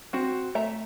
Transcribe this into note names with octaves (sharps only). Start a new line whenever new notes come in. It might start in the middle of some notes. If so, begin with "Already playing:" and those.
C4 F#4
A3 E5 A#5